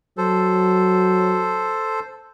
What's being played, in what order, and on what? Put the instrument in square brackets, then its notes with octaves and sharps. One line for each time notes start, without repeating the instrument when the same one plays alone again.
[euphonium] F#3 [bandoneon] A4 C5